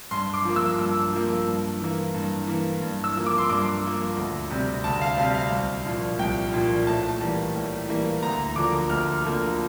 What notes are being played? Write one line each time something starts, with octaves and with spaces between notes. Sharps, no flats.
G2 C6
D6
F3 A#3
E6
G2
F3 A#3
G2
E3 A#3
G2
E3 A#3
G2
E6
F3 A#3
D6
C6
G2 D6
F3 A#3
D2
C3 G3
D2 A5
F5
C3 G3 F5
F5
C2
A#2 F3
C2 G5
A#2 F3
A2 A5
E3 G3 A#3
A2
E3 G3 A#3
D2 A#5
D3 F3 A#3 D6
D2 F6
D3 F3 A#3